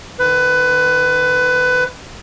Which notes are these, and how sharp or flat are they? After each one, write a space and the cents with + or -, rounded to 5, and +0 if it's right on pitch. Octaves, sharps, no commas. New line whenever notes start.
D#3 -30 B4 +20